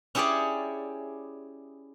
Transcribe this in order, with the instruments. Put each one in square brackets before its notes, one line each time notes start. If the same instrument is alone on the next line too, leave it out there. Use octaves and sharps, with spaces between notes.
[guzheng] C#4 E4 G4 G#4 C#5 D5